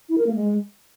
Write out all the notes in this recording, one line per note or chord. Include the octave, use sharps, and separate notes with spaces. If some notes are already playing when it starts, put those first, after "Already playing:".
E4
A#4
A#3
G#3